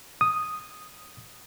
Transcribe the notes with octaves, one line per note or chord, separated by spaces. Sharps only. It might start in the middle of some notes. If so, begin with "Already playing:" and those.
D#6